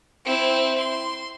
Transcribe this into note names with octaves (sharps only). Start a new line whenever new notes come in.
C4 E4
C6